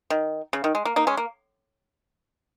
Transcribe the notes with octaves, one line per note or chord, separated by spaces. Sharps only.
D#3
C#3
D#3
G#3
A#3
A#3 D#4
G#3 C#4
A#3